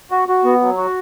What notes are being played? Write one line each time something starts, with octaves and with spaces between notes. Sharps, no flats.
F#4
F#4
B3
F#3
F#4